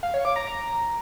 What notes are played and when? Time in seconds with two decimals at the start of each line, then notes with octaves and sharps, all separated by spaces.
0.03 F5
0.14 C#5
0.25 D6
0.36 A#5
0.47 A#5